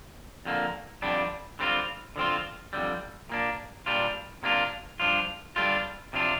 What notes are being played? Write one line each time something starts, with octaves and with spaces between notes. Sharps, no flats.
F2 D3 A#3
F2 D3 G3 D4
D3 G3 C4 F4
D3 F3 C4 F4
F2 D3 G3
A#2 A#3 D4
A#2 G3 D4 F4
C3 A#3 D4 F4
G2 F3 D4 F4
G2 D3 G3 D4 F4
C3 F3 D4 F4